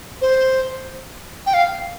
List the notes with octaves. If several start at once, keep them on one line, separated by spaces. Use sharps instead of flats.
C5
G5
F5